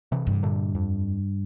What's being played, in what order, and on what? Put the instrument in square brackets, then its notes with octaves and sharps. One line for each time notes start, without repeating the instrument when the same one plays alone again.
[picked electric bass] C3 E3
[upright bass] G2
[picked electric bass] A#2 D3
F2